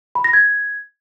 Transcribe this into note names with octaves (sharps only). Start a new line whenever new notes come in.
B5
A#6
G#6